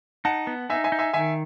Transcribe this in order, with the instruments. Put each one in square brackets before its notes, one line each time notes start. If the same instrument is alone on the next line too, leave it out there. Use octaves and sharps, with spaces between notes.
[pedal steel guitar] D#4 [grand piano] F#5 A5
[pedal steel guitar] B3
[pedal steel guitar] D#4 [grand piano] E5 G#5
[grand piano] E5 G#5
[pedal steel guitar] D#4
[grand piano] E5 G#5
[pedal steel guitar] D#3 [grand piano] E5 G#5